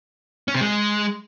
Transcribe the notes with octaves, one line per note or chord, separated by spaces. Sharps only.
C#4
C3
G#3